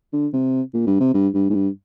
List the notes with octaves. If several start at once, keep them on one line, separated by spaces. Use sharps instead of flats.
D3
C3
A#2
G2
C3
G2
G2
G#2
G2